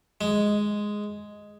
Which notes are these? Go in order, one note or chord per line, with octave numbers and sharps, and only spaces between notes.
G#3